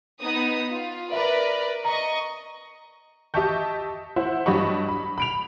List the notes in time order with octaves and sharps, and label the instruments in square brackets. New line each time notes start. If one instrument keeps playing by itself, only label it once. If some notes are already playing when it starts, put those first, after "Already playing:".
[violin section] B3 D#4 D#6
F4
[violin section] A#4 B4 D5 [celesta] E5 B5
[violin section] D#5 C#6 [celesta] A#5
[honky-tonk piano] G4 D#5 E5 A5 C#6 G6
E4 C5 F#5
G2 F#3 G4 D#5 B5 C#6
B5
B5 D7 F7